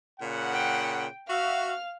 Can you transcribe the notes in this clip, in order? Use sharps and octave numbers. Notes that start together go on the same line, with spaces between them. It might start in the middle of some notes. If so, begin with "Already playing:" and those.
A#2 C#3 F#5
G5
F#4 E5 F5 F6